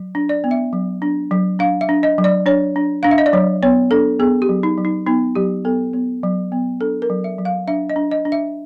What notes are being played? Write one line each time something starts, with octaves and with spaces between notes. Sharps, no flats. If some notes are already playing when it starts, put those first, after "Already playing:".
Already playing: F#3
D4
D5
B3
E5
F#3
D4
F#3
D4 F5
E5
D4
D#5
F#3
D5
D4 C#5
D4
D4 F5
E5
D#5
D5
F#3 C#5
B3 C#5
D4 A4
B3 G#4
G4
F#3
D#4
F#3
D#4
B3 D#4
F#3 G4
B3 A4
B3
F#3
B3
D4 A4
A#4
F#3
E5
F#3
F5
D4 E5
D#5
D4
D#5
D4
E5